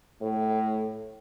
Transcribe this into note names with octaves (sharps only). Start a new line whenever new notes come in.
A2